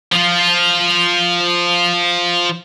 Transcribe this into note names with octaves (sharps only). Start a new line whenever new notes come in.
F3 F4